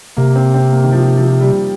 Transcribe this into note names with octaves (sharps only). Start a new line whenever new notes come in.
C3 A#3
C4
C4
A#3
D#3
F3
F3
G3